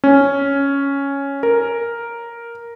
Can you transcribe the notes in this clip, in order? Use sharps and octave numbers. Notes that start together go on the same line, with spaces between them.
C#4
A#4